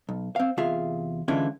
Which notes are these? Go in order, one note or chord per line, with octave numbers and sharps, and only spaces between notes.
B1
C4 F5
E2 C3 F4 G#4 E5 F5
D3 E3 G#3 C#4 E4 F4